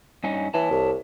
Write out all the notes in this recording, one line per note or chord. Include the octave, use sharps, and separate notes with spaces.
G2 C#4 D#4
E3 C#5 A5
C2